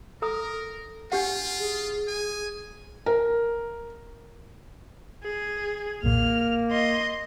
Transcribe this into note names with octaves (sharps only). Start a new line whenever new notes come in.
A4 A#4 A#5 D#6
D4 F4 G4 F#5
G#4
G#5
A#4
G#4
B1 E2 A#2 A#3 F6
D#5 C6